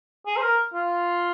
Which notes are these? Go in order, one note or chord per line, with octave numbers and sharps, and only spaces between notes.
G#4
C5
A#4
F4